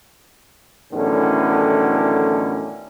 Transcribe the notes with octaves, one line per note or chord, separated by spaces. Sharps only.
E2 A2 D3 D#3 F#3 C#4